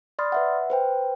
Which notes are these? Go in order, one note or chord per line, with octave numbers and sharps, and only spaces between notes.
D5 B5 C6 D#6 F6 A6
B4 E5 F#5
B4 C5 G5